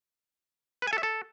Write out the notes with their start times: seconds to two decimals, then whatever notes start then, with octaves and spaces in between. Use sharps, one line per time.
0.82 B4
0.87 G#5
0.93 A4
0.98 E5
1.03 A4